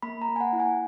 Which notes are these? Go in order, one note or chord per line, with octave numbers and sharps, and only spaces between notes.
A#3 B5
A#5
A#3
G#5
F#5
E4
G#5